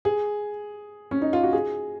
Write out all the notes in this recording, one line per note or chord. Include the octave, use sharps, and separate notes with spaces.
G#4
C#4
D#4
F4
F#4
G#4